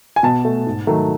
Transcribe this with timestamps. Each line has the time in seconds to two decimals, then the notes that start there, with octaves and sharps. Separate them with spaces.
0.16 G#5
0.23 B2 A5
0.45 A3
0.66 G#2
0.87 D#3 F#3 A3